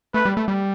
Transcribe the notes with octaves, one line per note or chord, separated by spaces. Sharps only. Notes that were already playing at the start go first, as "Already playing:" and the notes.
A3 B4
G3
A3
G3